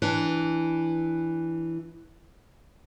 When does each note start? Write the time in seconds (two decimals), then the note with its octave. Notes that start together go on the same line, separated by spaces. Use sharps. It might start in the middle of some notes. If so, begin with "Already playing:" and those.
0.02 E3 D4